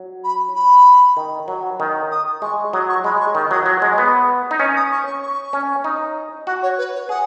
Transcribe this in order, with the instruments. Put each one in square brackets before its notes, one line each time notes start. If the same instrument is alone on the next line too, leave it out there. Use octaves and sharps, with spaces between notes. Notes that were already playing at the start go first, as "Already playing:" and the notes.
Already playing: [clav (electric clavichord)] F#3
[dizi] B5
B5
[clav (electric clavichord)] D#3
F#3
D#3
[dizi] D#6
[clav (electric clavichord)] G#3 [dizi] C#6
[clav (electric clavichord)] F#3 [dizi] D#6
[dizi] C#6
[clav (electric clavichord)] G#3 [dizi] B5
[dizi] C#6
[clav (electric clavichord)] D#3 [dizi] C#6
[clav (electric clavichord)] F#3 [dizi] D#6
[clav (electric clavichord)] F#3 [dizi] C#6
[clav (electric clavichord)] G#3 [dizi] D#6
[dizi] C#6
[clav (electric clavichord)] B3 [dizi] D#6
[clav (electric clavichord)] D#4
[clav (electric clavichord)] C#4 [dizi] C#6
[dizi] D#6
C#6
C#6
C#6
[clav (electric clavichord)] C#4
D#4
[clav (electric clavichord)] F#4 [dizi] F#5
[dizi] C#5
B4
C#5
[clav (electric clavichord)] G#4 [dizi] F#5